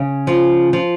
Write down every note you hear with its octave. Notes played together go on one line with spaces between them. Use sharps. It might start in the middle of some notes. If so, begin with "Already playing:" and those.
Already playing: C#3
F3
F3